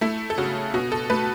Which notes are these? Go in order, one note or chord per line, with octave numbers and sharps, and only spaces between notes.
A3 E4
A4
C#3 F#4
B2 F#4
A4
A3 B4